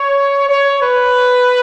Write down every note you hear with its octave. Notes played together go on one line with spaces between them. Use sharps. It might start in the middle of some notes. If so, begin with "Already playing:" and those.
Already playing: C#5
C#5
B4